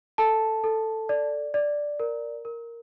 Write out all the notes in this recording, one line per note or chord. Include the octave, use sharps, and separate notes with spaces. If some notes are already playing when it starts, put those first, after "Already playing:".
A4 A5
A4
D5
D5
A#4
A#4